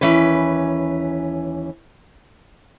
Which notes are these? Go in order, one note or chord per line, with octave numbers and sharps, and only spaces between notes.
D#2 E3 C#4 B4